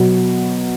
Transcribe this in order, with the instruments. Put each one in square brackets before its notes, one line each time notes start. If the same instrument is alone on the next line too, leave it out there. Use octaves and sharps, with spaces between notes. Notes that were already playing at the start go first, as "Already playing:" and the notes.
Already playing: [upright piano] B2 F#3